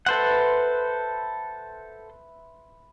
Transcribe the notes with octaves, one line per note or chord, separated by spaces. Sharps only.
A4 B4 C5 E5 F#5 C6